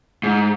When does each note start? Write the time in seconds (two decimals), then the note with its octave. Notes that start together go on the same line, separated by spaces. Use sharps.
0.23 G#2